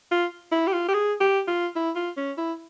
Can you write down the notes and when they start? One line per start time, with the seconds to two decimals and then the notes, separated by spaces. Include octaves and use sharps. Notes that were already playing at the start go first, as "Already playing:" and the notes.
0.12 F4
0.52 E4
0.68 G4
0.73 F4
0.88 G4
0.94 G#4
1.20 G4
1.48 F4
1.76 E4
1.96 F4
2.17 C#4
2.38 E4